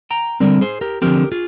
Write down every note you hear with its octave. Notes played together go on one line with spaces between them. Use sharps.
G5 A#5
D3 G3 C4 A#4 D5
G#4 C5
G4 A#4
D3 F3 C4 G4 A#4
F4 G#4